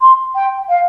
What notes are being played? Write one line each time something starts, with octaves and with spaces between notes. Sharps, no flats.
C6
G5
F5